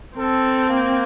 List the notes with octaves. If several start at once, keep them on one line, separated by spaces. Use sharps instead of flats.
C4 A4
A#3